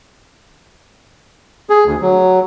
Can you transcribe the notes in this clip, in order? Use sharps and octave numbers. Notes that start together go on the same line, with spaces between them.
G#4
D2
F#3